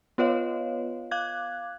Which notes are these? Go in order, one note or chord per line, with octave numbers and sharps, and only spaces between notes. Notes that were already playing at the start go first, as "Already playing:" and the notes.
B3 F4 B4 C#5 D#5 F5
F5 D6 F#6 G#6